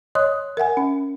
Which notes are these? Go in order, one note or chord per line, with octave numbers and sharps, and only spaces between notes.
C#5 D#5 C6 D#6 F#6
A#4 E5 F#5 G#5
C#4